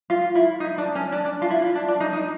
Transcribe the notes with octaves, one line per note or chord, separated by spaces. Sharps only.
F4
E4
D#4
D4
C#4
D4
D4
F4
E4
F4
D4
D4
D#4
D#4